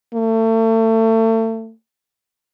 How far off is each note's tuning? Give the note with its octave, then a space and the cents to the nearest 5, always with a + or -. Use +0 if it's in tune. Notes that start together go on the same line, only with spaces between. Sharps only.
A3 +35